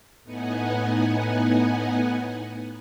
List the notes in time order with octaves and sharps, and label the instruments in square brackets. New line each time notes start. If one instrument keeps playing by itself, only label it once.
[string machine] A2 B3 D#4 F#5 G#5